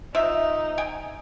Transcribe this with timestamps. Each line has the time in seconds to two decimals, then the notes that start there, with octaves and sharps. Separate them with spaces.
0.15 C3 D#4 F4 E5
0.78 G5 G#5